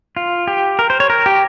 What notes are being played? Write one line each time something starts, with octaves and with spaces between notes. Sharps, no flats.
F4
G4
A#4
C5
C#5
A#4
G4